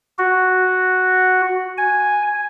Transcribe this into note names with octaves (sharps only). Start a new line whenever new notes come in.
F#4
G#5